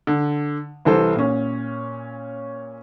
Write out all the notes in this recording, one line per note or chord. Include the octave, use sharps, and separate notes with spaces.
D3
C2 E3 A4 C5
A#2 C#4